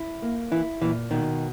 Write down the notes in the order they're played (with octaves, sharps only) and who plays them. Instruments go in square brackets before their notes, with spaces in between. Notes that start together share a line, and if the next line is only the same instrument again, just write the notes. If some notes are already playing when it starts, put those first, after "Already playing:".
Already playing: [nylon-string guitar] E4
A#3
[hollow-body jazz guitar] E3 [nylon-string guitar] E4
[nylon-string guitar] A#2 [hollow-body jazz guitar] E3
[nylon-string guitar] B2 [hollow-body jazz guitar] D#3